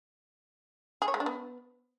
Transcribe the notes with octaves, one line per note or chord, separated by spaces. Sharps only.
G#4
C#5
G#3
D4
B3